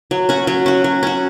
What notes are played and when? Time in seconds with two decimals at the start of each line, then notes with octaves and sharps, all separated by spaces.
0.11 F#3
0.29 C#4 F#4
0.47 F#3
0.66 C#4 F#4
0.84 F#3
1.03 C#4 F#4